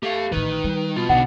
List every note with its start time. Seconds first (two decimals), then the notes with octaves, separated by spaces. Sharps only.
0.03 A3 G4 F5
0.32 A1 A2 D#3 B4
0.64 G3
0.96 B2 F4
1.09 B1 D3 D4 D#4 F#5